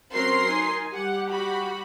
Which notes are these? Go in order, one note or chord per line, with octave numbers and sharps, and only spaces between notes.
F#3 C4 C#4 A#4 C6 C7
D#4 G#5
G3 G4 F#5
F#4 B5